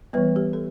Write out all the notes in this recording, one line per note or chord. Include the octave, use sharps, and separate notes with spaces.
E3 G3 B3 B4
G4
A4